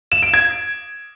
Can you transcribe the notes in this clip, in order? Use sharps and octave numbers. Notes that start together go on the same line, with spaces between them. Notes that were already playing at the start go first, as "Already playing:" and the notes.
E7
D7
G#6